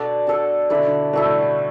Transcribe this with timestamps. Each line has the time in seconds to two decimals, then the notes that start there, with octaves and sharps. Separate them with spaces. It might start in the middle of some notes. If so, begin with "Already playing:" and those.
Already playing: B2 D4 A4 D5
0.27 D4 A4 D5
0.70 D3 E4 A4 D5
0.78 B2
0.87 D3
1.13 B2 E4 A4 D5
1.25 A2
1.38 B2